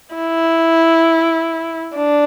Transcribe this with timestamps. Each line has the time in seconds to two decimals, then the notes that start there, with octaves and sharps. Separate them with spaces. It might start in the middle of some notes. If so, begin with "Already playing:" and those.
0.15 E4
1.96 D4